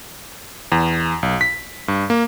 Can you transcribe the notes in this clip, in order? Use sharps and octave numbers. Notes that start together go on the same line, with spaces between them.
E2
B1
B6
G2
A#3